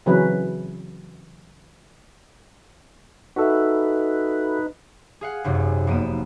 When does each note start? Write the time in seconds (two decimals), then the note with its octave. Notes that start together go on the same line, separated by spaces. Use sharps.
0.06 C#3 E3 F#3 C4 C#4 B4
3.36 D#4 F#4 A4 B4 E5
5.21 G#4 F5 F#5
5.44 G#1 F#2 C3
5.87 F1 A#3 B3 D#7 E7